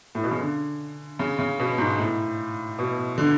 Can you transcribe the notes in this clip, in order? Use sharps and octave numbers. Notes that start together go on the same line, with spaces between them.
A2
B2
C#3
D3
C#3
C#3
B2
G#2
A2
B2
D3